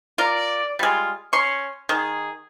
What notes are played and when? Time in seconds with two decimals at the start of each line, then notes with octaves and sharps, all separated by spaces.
0.18 F4 A#4 D5
0.79 G3 G#3 F4
1.33 C#4 C6 C#6
1.89 D#3 G#4